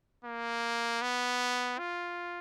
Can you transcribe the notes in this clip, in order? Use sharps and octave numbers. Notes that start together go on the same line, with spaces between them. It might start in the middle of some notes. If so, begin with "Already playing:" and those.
A#3
B3
F4